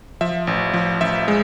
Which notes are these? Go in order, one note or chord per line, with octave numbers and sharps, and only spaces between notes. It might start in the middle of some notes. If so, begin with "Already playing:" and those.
F3 E5
A1
F3
A1 E5
G#3